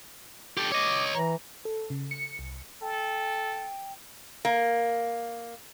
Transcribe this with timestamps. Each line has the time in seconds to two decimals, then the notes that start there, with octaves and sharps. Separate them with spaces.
0.57 G4 A4
0.72 C#5 D#5 D6
1.14 E3 A#5
1.65 A4
1.90 C#3
2.11 C#7
2.39 C2
2.82 A4 G5
4.45 A#3